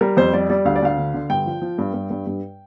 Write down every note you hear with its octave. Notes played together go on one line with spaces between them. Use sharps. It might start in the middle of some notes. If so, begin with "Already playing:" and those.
G3 A#4
F2 C5
G3 D5
G3 D5
D2 F5
D5
D2 F5
D3
D3
G2 G5
F3
F3
G2
G2
G2
G2